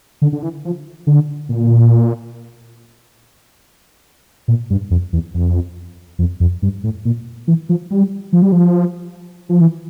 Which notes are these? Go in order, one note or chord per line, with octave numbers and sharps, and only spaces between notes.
D3
D3
E3
F3
D3
A#2
A#2
G2
F2
E2
F2
F2
F2
G2
A2
A#2
E3
F3
G3
F3
G3
F3
F3
E3